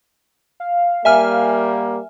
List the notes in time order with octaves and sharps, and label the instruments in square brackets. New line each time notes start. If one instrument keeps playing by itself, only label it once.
[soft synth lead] F5
[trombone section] G3 A#3 [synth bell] E5 G#5 F6